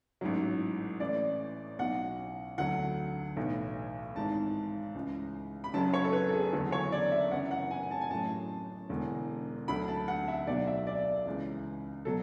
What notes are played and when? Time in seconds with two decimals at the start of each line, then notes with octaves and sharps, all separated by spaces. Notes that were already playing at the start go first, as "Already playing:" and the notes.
0.21 A1 G#2 F#3
1.00 A1 A2 E3 D5
1.79 B1 B2 F#3 F#5
2.58 D2 D3 F#3 F#5
3.37 B1 A2 E3
4.16 G#1 G#2 E3 A5
4.95 C#2 C#3 E3
5.64 B5
5.73 F#1 F#2 C#3 F#3 A5
5.94 C#5
6.04 A4
6.13 B4
6.29 A4
6.33 G#4
6.53 F#1 E2 D3 F#3 A4
6.72 C#5
6.92 D5
7.12 E5
7.31 F#1 F#2 E3 F#5
7.51 F#5
7.71 G#5
7.83 G#5
7.91 A5
8.01 G#5
8.10 A1 A2 F#3 A5
8.89 E1 E2 D3
9.68 D2 D3 F#3 B5
9.88 A5
10.08 F#5
10.28 E5
10.47 B1 B2 F#3 D5
10.67 E5
10.87 D5
11.26 C#2 C#3 E3
12.05 B2 F#3 A4